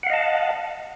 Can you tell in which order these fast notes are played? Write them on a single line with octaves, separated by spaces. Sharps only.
F#5 F5 D#5 A5